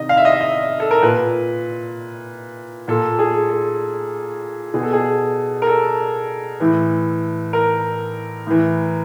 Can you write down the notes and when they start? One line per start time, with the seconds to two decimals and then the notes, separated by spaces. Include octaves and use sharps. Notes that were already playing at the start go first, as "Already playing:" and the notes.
Already playing: C3 D#3 D#5
0.09 F5
0.17 E5
0.25 D#5
0.32 E5
0.41 D#5
0.80 A4
0.91 A#4
1.02 A#2 B4
2.88 A#2 A4
3.19 G#4
3.50 A4
4.74 B2 G#4
4.83 A4
4.93 G#4
5.62 A#4
5.67 A4
6.60 A2 E3
7.53 A#4
8.47 A2 E3